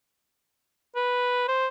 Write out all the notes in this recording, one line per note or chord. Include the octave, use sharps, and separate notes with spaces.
B4
C5